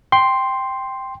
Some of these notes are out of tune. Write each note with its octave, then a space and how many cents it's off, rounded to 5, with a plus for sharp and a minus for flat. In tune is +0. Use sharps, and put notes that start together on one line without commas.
G5 +0 C6 +0